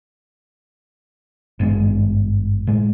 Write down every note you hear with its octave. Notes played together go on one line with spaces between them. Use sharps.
G#1 G2 G#3 D4
A2 G#3